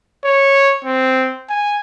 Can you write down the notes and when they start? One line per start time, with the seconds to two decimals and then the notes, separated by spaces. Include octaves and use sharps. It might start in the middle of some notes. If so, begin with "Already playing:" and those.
0.25 C#5
0.85 C4
1.49 G#5